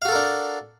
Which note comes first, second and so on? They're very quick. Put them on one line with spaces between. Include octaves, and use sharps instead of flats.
F5 F#4 A4 A#4 D4